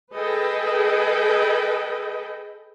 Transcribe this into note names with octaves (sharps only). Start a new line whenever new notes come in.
G#4 A4 B4 D#5 G5